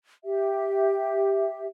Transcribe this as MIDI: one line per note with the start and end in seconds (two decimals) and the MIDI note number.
0.25 1.66 67
0.25 1.66 76